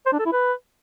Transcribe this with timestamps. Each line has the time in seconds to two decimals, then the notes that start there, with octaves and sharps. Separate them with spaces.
0.06 C5
0.13 D4
0.19 A4
0.26 E4
0.32 B4